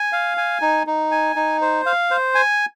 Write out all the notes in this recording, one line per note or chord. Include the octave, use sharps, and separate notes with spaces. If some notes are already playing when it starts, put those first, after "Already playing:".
Already playing: G#5
F5
G#5
D#4
D#4
G#5
D#4
C5
F5
C5
G#5